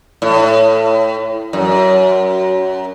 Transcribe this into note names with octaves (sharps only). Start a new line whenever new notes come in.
A2
F#2